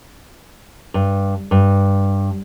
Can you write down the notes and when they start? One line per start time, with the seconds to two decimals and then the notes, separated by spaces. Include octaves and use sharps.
0.94 G2
1.51 G2